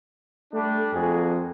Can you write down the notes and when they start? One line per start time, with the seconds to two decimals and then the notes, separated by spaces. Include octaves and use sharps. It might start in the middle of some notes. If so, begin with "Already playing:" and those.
0.54 G3 A3 D4
0.94 F2 A#3 F#4 G#4